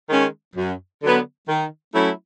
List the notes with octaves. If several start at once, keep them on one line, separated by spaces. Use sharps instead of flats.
D#3 G#3 C#4
F#2
D3 F#3 B3
D#3
F#3 A3 C#4 E4